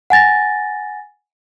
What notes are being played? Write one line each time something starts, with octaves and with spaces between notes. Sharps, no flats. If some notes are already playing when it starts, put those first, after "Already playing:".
F#5 G#5 A6 A#6